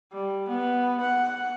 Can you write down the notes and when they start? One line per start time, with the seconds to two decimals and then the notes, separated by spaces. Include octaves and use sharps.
0.12 G3
0.48 B3
1.01 F#5